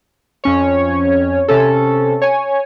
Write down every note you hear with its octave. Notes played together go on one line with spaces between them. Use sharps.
F2 C#4 C#5
C3 C#4 A4
C#5 G#5